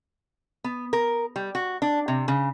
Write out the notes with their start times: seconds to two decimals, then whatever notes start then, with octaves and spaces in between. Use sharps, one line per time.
0.64 B3
0.93 A#4
1.36 G3
1.55 F#4
1.82 D4
2.08 C3
2.28 C#3